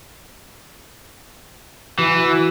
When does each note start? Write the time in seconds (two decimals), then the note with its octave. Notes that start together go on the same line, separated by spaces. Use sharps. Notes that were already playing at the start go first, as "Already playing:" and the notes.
1.99 E3 E4 F#4